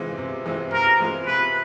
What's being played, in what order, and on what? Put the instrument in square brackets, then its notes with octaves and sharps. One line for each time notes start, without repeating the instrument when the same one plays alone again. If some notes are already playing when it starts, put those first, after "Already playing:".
Already playing: [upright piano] C3 E3 G#3 C4 F4
C3
E3 G#3 C4 F4
[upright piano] C3 [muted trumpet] A#4
[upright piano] E3 G#3 C4 F4
[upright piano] C3 [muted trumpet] B4